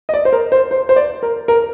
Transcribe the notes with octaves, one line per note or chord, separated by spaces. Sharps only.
D#5
D5
C5
A#4
C5
C5
C5
D5
A#4
A#4